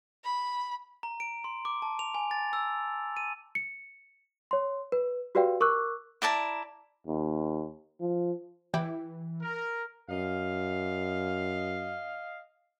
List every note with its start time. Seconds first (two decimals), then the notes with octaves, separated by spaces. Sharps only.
0.24 B5
1.03 A#5
1.20 D7
1.44 C6
1.65 D6
1.82 A5
1.99 F7
2.15 G#5
2.31 A6
2.53 E6
3.17 D#7
3.55 C#7
4.51 C#5 C6
4.92 B4
5.35 F#4 G4 B4 D5 F5 G5
5.61 A#4 C#6 D6 E6 F#6
6.22 E4 D5 A5 A#5
7.07 D#2
8.00 F3
8.74 E3 E4 G4
9.42 A#4
10.09 F#2 D#5 F5